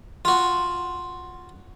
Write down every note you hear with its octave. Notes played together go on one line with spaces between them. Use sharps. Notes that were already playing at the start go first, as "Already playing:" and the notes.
F4 F#4